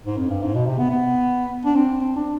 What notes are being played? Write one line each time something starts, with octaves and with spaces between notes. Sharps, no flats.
G#2
F2
G2
G#2
B2
C3
B3
B3
D4
C4
C4
D4